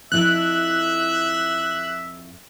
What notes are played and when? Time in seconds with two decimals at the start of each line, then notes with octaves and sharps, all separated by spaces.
0.12 F2 E4 A4 E5 F#6